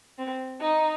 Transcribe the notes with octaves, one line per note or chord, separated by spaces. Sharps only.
C4
D#4